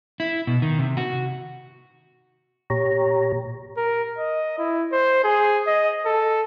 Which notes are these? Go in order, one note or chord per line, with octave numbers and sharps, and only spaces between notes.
E4
B2
D#3
C3
F#4
A#2 G4 C#5 A#5
A#4
D#5
E4
C5
G#4
D#5
A4